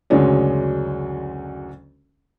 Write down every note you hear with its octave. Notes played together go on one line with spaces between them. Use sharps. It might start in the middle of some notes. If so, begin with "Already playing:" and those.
F#1 D2 F#3 G#3 C#4 D4